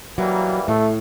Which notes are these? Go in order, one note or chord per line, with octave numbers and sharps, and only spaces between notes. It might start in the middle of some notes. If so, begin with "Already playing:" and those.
E3 F#3 G3 A#3
A2 A3